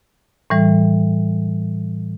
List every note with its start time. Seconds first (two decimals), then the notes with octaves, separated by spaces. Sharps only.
0.50 A2 E3 G3